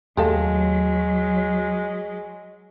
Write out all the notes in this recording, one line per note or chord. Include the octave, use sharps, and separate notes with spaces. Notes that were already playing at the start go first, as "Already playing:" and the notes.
D#2 F#3 G#3 A3 G4 A4 F5